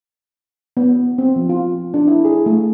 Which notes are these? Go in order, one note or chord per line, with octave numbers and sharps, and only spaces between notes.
B3
C4
F3
F4
D4
E4
G#4
A3